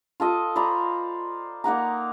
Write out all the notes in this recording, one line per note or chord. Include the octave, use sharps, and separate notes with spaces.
F4 A4 D#5
C5 D5 A#5 B5
A#3 D#4 F#5 A#5